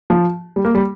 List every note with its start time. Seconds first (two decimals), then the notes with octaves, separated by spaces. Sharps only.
0.10 F3
0.56 G3
0.65 A#3
0.75 G3